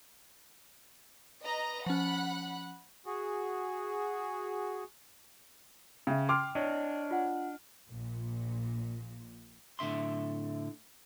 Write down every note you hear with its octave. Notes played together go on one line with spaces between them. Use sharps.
B4 D#5 A#5
F3 C#4 F#5 B5 F#6
F#4 G#4
C#3 E5 G5
G5 C6 D6 F6
D4 C#5 D#5
F4 F#5
A#1 A#2
A2 D3 E5 C6